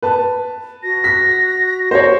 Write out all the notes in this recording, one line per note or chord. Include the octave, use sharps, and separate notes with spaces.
B4 A5
F#4 A#6
B6
C5 C#5